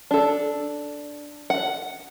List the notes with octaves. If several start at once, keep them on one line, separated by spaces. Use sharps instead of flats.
D4 A4
F#5